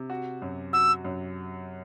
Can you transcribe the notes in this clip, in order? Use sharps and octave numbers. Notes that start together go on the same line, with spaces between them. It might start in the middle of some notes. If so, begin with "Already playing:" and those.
Already playing: C3
F#4
F#2
F#4 E6
F#2